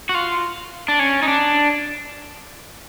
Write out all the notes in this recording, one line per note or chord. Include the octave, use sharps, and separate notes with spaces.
F#4
F4
D4
C#4
D#4
D4